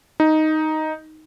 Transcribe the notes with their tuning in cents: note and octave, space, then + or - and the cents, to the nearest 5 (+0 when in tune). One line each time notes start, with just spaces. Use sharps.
D#4 +5